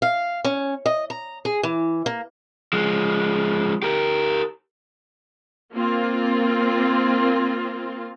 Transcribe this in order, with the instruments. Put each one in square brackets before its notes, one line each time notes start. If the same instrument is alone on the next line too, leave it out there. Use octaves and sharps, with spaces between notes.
[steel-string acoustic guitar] F5
C#4
D#5
A#5
G#4
E3
A#3
[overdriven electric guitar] F3 G#3
G4 A#4
[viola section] A#3 C4 F4